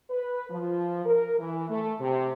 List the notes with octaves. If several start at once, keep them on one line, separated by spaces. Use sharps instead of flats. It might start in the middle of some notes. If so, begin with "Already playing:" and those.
B4
F3
A#4
E3
A3
C3